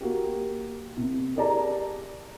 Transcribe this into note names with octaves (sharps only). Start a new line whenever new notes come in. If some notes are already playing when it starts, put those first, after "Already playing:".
A#3 F#4 G4
C3
G4 G#4 A#4 D5 A5 A#5